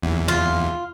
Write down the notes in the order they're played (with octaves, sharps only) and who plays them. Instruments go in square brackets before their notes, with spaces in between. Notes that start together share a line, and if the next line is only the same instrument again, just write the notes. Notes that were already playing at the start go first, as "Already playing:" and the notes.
[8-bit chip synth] E2
[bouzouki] F4